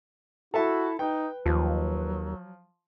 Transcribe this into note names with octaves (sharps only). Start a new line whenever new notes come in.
E4 F#4 A4 E5 A5
D#4 B4 G5
D#2 F3 F#3